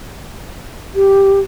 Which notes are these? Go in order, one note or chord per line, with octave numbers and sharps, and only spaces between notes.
G4